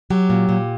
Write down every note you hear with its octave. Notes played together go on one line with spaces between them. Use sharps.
F#3 G4
A#2
A#2